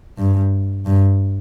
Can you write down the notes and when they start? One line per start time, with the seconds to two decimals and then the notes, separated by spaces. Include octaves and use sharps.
0.18 G2
0.86 G2